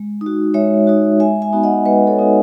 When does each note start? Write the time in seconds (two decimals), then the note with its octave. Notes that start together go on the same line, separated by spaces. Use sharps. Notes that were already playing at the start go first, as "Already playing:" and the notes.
Already playing: G#3
0.21 D#4
0.26 F#4
0.54 G#3 C#5 E5
0.87 D#4 F#4
1.20 G#3 E5 G#5
1.42 E5 G#5
1.53 B3 D#4 F#4
1.63 D#5 F#5
1.85 G#3 B4 D#5
2.07 A4 C#5
2.19 B3 D#4 F#4